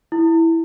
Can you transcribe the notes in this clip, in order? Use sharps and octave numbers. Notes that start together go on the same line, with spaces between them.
E4